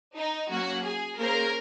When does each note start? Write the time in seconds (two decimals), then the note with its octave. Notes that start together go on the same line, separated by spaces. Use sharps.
0.16 D#4
0.50 F#3 A#3 C#4 F#4
0.85 G#4
1.19 A#3 C#4 G#4 A#4 C5